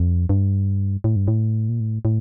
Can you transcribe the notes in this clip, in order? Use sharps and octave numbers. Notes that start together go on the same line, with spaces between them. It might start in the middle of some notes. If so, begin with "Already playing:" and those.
Already playing: F2
G2
A2
G2
A2
A#2
A2
A2